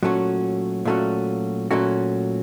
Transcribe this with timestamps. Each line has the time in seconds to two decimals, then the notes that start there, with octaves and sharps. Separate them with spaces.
0.03 A#2 F#3 A3 C#4 F#4
0.85 A#2 F#3 A3 C#4 F#4
1.71 A#2 F#3 A3 C#4 F#4